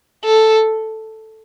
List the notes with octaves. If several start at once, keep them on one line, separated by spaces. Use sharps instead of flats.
A4